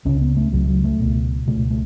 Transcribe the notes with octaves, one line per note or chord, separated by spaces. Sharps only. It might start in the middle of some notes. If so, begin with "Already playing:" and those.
C#2 C#3 C#4
B3
A3
C#2 C#3 F#3
F#3
A3
C#2 B2
C#2 B2 A3
A3